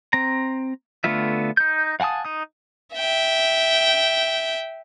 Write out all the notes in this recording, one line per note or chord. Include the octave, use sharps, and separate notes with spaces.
C4 A#5
D3 A3 B3 F4 E5
D#4 G6
F5 F#5 G#5 A5 D#6
D#4 D#6
E5 G5